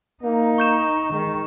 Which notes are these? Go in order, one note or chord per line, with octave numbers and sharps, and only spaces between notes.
A#3 D#4
C#6 G6 E7
D#3 G#3